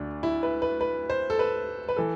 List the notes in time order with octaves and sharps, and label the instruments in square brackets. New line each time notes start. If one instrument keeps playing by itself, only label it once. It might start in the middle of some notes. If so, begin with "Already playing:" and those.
Already playing: [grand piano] D2 D3 D4
E4
B4
B4
B4
C5
A4
B4
B4
E3 A4